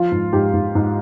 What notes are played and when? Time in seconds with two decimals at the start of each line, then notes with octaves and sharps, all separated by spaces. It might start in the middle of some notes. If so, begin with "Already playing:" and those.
Already playing: F3 F4
0.12 G#2
0.33 G#2 G4
0.54 G#2
0.75 G#2